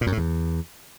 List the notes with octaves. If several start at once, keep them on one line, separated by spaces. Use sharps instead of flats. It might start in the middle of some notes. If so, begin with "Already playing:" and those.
A#2
F#2
A2
E2